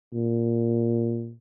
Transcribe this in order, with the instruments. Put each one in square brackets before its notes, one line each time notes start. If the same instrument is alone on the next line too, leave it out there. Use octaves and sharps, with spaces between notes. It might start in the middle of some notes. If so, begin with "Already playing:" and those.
[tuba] A#2